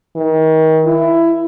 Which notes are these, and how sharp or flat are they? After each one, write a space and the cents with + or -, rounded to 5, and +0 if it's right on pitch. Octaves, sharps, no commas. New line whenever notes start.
D#3 +35
E4 +15